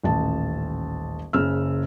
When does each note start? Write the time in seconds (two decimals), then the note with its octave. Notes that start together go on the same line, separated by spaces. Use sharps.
0.03 D#1 A1 A5
1.33 F#1 C#3 E6 F6